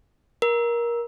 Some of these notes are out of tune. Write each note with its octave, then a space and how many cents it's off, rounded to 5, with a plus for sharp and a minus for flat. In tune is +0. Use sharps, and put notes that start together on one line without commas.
A#4 +20